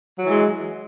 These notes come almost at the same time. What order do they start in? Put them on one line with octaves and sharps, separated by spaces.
F#3 E3 G#3